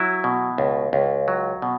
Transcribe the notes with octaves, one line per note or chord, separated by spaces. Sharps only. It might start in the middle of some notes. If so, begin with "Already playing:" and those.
Already playing: F#3 E4
B2
C#2
C#2
F#3
B2